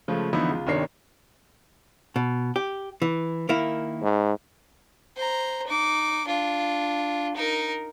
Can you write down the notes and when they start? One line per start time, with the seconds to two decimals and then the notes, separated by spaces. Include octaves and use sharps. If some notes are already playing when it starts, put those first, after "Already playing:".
0.08 C#3 F3 G#3 A3
0.33 D3 E3 F3 B3 D#4 E4
0.49 C#2 F4
0.67 G1 C2 D#3 D4 C#5 C7
2.16 B2
2.56 G4
3.02 E3
3.49 D#3 A#3 E4
4.02 G#2
5.16 C5 A#5
5.67 D#4 D6
6.26 D4 F4
7.35 D#4 A#4